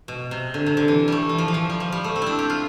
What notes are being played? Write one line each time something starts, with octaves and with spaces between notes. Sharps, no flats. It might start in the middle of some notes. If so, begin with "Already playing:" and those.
B2
C3
D3
C3
D3
E3
G3 A3
E3
F3
E3
F3
G3
F3
G3
A3
C4
D4 E4
G4
F4